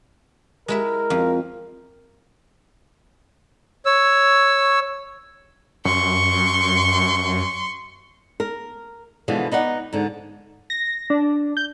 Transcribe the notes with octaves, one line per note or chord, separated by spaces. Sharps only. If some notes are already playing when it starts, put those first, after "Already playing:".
G#3 E4 A#4 E5
F2
C#5 E6
F#2 C6 C#6
A#4
B2 D3 E3 F3 G#3
B3 D#4 D5 F#5
G#2 D3
A#6
D4
G6